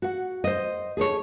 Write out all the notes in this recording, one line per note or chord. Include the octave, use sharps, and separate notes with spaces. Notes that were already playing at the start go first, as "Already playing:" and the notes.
F#4 F#5
C5 D#5
G#4 A4 C5 C#5